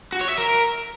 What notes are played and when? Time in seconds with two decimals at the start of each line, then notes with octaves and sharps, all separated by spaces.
0.12 F#4
0.21 C#5
0.29 E5
0.38 A#4